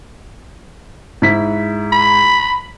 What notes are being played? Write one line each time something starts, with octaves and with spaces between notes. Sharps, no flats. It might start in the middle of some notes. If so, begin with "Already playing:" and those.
G#2 E4 B6
B5